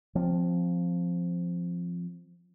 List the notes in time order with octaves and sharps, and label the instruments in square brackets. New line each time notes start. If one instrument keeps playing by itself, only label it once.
[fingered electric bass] F3 C4